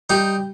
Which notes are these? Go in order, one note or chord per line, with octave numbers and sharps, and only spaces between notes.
G3 D#4 G4